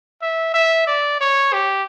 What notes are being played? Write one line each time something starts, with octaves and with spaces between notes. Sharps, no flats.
E5
E5
D5
C#5
G4